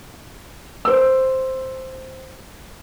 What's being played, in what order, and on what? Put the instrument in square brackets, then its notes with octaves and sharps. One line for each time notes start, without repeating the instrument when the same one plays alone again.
[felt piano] C5 E6